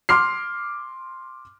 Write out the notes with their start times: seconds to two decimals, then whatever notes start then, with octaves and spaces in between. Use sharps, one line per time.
0.09 C6 D6 F6 C7